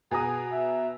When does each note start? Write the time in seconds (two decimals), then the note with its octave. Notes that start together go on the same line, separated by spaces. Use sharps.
0.11 B2 F#4 G#4 G#5 A#5 D#6
0.52 E5